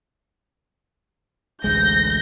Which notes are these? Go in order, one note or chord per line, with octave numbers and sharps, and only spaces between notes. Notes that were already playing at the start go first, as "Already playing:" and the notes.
A1 D2 G#3 G6 A#6